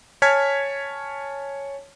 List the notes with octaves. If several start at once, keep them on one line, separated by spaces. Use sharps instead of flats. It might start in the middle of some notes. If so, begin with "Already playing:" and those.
C#5 G#5 A5 F6 G#6 B6